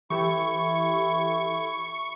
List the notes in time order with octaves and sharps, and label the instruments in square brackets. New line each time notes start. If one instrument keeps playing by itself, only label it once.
[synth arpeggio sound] E3 G4 A4 [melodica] E4 [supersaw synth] C#6